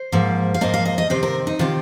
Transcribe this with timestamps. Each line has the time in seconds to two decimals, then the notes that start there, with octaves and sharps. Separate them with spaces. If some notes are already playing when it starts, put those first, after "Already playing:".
Already playing: C5
0.12 G#2 F3 A#3
0.54 F5
0.61 G#2 F3 A#3 D#5
0.74 F5
0.86 D#5
0.98 D#5
1.10 C3 D#3 C4 C5
1.23 A#4
1.47 D#4
1.59 C3 D#3 C4 F4